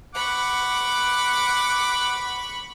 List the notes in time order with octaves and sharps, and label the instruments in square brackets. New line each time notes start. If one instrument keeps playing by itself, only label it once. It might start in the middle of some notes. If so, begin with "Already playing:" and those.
[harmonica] F#5 D6 [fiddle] B5 C#6